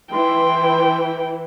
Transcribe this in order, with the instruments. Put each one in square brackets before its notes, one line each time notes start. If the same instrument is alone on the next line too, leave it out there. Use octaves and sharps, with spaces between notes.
[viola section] E3 E4 [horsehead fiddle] G5 [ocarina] C6